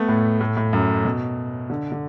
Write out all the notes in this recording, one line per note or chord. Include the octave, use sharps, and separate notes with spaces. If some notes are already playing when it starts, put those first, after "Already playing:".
Already playing: A3 B3
A2
A2
A2
F#2
B2
D3
D3